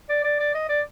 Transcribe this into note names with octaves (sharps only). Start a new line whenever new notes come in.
D5
D5
D5
D#5
D5